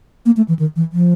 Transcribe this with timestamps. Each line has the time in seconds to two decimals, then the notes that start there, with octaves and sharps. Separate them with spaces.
0.26 A#3
0.37 A3
0.48 E3
0.59 D#3
0.76 E3
0.93 F3